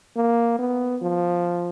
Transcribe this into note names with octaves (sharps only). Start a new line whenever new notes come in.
A#3
B3
F3